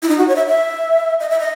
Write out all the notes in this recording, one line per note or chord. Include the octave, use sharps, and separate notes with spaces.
E4
D#4
F#4
C#5
E5
E5
D#5
E5
D#5